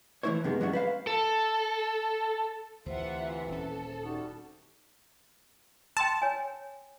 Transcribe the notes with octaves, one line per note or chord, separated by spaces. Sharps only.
E3 A3 E4 C5 C#5
F#2 C3 D#3 G#3 B3
G2 F#3 G#3 C#4 E4 F#4
B4 C5 F5
A4
D2 C3 E3 F4 C5 E5 F#5
D#1 C#4 A4
C3 G3 D#4 F#4
G5 A5 C6 E6
C#5 G#5